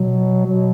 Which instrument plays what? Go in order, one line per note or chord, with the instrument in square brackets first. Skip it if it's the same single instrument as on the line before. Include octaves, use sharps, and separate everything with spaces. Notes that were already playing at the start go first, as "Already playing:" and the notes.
Already playing: [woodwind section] B2 F#3
B2 F#3